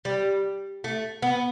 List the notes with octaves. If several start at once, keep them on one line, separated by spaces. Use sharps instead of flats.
G3
A3
B3